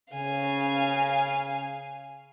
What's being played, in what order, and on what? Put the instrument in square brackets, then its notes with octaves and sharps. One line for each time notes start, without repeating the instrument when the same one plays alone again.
[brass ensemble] C#3 [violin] F5 G#5